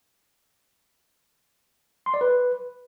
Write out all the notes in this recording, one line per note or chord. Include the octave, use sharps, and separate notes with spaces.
C6
D5
B4